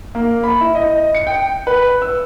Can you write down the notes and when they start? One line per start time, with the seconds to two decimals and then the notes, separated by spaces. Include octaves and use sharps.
0.15 A#3
0.43 B5
0.61 E4
0.75 D#5
1.15 C#7
1.27 G5
1.67 B4
2.02 E6